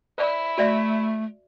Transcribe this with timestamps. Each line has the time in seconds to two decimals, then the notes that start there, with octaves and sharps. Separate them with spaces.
0.18 E4 C5 D5
0.58 A3 F#4 D5 E5